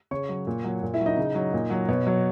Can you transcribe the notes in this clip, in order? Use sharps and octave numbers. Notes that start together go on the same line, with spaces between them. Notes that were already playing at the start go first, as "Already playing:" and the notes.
C#3 C#5 C#6
F#3
A#2
F#3
A#2
E4 E5
F#3
D#4 D#5
C#3
F#3
A#2
F#3
B2 C#5
F#3